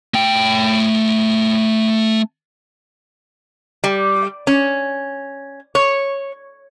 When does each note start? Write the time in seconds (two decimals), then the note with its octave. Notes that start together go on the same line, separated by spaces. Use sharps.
0.14 A3 G5
3.84 G3
4.47 C#4
5.75 C#5